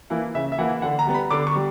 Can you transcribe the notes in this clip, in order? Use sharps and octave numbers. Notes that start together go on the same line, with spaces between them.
E3 A#3 E4
C#3 E5
E5
E3 A#3 E4 F#5
D3 F#5
A#5
G3 B3
B5
D3 D6
C#6
G3